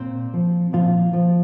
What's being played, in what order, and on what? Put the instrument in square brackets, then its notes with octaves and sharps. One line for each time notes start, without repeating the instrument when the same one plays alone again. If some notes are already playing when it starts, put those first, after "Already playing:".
Already playing: [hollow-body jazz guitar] A#2 C4 C5
F3
A#2 F3 F4
F3